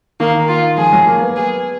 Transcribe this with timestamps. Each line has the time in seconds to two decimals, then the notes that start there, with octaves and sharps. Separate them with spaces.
0.20 D#3 A#3
0.48 F4
0.78 F3 G#4
0.93 F#3
1.07 A#3
1.22 B3
1.36 G#4